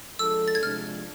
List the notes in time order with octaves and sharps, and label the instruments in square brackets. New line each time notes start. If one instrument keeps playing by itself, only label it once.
[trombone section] F3 G#3 D4 A4 [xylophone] E6
[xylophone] A6
G#6
[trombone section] C2 C3 F3 G#3 D4 [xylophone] F6